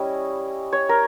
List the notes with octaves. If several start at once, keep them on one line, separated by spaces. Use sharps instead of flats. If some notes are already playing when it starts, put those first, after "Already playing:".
Already playing: G3 C#4 E4 D#5
C#5
A#4